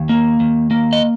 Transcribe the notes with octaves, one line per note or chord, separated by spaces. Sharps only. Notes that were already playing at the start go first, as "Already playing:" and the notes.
Already playing: D#2
A#3
D#2
A#3
D#5